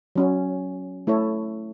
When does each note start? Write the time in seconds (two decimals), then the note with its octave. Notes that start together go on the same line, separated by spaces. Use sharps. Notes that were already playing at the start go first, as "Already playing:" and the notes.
0.16 F#3 C#4 F#4
1.07 A3 E4 A4 C#5